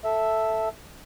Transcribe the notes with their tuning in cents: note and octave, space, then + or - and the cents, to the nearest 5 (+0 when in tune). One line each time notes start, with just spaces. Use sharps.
A4 +0 E5 +0